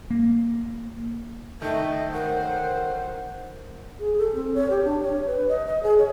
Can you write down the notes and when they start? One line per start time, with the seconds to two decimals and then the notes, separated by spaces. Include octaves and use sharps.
0.11 A#3
1.62 D#3 A3 D#5 E5
2.13 D3 F#3 A#4 C5 F#5
4.00 G#4
4.18 A4
4.35 C4
4.54 C#5
4.70 G4
4.84 D4
5.02 C#5
5.27 B4
5.49 D#5
5.66 D#5
5.83 G#4
5.98 C#5